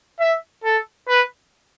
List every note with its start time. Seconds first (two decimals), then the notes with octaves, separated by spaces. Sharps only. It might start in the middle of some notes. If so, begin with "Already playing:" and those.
0.20 E5
0.64 A4
1.08 B4